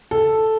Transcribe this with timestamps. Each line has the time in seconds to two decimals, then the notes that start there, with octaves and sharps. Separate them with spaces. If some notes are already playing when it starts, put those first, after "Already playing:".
0.11 A4